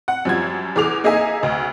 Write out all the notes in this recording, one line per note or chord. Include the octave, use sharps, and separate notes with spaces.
F#5
F#2 F3 G3 G#6
E2 G#4 D6 F7
A#3 D#4 G#4 D#5 E5 G#5
D2